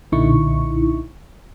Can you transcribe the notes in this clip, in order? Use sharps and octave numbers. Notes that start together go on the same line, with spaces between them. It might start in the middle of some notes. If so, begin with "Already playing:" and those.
B1 A#2 D3 D#4 E4 C#6